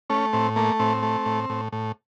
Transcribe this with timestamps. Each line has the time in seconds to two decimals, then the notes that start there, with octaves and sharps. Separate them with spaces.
0.10 A3 C#4
0.33 A2 C4
0.56 A3 A#3
0.79 A2 C4
1.03 A3
1.26 A2
1.49 A2
1.72 A2